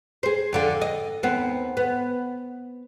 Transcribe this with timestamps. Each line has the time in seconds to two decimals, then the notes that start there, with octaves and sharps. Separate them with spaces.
0.23 G#4 C5
0.53 F2 D3 F4
0.82 D#5
1.23 D#2 B3 C4
1.77 B3